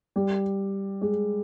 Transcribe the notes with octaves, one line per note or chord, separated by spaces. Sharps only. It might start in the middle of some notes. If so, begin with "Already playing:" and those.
G3
G#3